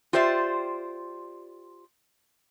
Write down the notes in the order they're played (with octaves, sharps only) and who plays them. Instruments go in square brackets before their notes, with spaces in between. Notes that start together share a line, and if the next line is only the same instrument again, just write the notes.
[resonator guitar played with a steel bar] F4 G4 C5 D5 E5